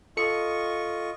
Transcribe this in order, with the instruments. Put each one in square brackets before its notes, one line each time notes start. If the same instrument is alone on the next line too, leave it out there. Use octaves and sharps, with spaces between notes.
[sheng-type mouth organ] F4 D#5 C#6 [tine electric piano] A4 C#7